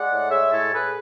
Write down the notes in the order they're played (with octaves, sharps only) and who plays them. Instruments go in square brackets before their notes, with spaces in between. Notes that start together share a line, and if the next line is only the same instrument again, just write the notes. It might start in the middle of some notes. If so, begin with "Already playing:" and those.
Already playing: [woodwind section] G#3 D5 F#5
A2
G#3 C#5 E5
A2 A4 C#5
A2 G#4 B4